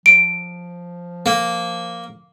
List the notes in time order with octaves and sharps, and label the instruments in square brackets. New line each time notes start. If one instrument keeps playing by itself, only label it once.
[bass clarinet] F3 [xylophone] D7
[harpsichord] A#3